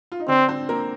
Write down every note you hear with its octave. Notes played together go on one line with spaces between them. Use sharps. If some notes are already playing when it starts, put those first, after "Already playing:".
F4
D#4
D3 C4 D4
C4 C5
A#3 A#4